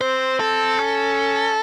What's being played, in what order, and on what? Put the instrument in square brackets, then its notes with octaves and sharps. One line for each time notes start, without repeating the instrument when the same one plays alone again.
[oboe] C4 [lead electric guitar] C5
[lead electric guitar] A4
[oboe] C#4